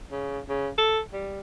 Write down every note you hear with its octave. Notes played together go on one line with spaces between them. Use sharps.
C#3
C#3
A4
G3